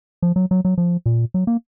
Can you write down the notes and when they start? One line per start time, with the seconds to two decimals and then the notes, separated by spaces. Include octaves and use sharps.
0.22 F3
0.36 F#3
0.51 F#3
0.65 F#3
0.78 F3
1.06 A#2
1.34 F#3
1.47 A#3